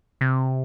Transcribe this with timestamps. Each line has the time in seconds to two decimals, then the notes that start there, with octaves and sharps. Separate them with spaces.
0.21 C3